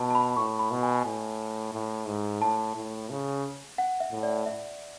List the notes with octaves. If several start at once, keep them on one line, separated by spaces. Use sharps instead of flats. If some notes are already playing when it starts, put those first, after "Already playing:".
Already playing: B2 A5
A5
B5
A2 C#6
B5
B2
G#5
A2
A2
G#2
A2 A5
A2
C#3
F#5
E5
A2
D5
E5